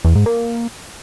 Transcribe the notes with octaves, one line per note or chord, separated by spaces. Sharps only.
E2
G#2
A#3